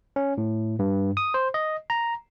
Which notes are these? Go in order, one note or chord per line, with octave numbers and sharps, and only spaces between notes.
C#4
A2
G2
D#6
C5
D#5
A#5